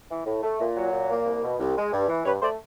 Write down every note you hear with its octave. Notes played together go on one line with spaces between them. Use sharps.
E3
A2
A3
A#2
F#3
A#2
A#3
C2
B2
C2
G#3
G2
E3
G2 B4 C#5
A3 C5 D5